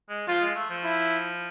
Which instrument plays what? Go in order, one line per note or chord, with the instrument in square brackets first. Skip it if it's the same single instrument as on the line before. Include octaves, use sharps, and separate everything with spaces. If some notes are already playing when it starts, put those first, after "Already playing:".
[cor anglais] G#3
[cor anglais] F3 [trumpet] F4
[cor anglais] G#3
A3
F3
[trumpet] E4